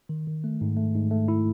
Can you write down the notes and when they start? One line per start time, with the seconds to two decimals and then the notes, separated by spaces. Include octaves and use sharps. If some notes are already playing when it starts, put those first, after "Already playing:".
0.09 D#3
0.27 D#3
0.44 A3
0.61 G#2
0.77 A3
0.95 G#2
1.11 A3
1.28 E4